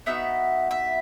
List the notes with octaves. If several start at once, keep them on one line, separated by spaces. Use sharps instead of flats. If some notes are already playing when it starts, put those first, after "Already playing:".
B3 D#4 F#4 E5
E5